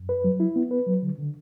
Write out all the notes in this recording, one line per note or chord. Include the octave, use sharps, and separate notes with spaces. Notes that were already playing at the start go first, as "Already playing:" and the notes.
Already playing: F#2
B4
F#3
E4
B3
B4
F#3
D3
D3